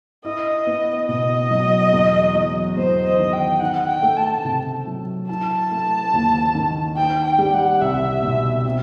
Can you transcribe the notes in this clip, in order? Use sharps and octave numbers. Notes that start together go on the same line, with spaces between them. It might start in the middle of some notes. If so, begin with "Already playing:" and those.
E4 D#5
B3
B2 D#5
F#3
E2
F#3
E2 C5
D#5
D#3
G5
D#4 F#5
G5
A3
A5
C3
F#3
E4 A5
A3
D#2
D#3
D#4 G5
G5
G3
F#5
C2 E5
B2
C4